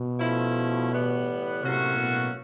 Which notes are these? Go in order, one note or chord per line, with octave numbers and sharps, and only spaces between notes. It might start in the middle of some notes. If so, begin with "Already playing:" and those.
Already playing: B2
F3 A3 C#4 E4
A2 E3 G3 B3
A2 C3 F#3 A#3 C#4 F#4
B2